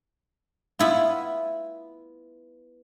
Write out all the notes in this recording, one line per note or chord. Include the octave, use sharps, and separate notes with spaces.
B3 E4 F4